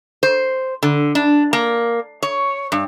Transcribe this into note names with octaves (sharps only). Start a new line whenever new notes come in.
C5
D3
D4
A#3
C#5
G2